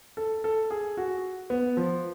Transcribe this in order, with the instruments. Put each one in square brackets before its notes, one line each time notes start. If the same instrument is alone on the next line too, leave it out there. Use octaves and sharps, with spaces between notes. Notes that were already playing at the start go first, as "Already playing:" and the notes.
[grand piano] A4
A4
G#4
F#4
B3
F3